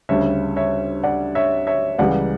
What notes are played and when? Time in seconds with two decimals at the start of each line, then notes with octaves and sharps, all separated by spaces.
0.09 D2 C#3 G3 C#5 E5
0.56 C#5 E5
1.03 D5 F#5
1.35 C#5 E5
1.67 C#5 E5
1.98 C#2 C#3 E3 G3 D5 F#5